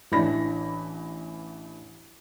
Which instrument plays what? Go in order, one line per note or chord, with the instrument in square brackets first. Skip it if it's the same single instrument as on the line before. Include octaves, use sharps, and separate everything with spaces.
[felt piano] A1 E3 D4 B5 A#6